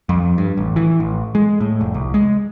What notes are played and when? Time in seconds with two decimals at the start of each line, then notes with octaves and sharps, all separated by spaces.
0.09 F2
0.38 G2
0.57 A1
0.76 E3
1.00 A1
1.35 G#3
1.61 A2
1.81 F1
1.94 C2
2.14 G#3